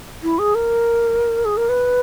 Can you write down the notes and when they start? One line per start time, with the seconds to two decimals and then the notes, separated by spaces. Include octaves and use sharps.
0.23 E4
0.39 G#4
0.55 A#4
1.45 G#4
1.57 A#4
1.69 B4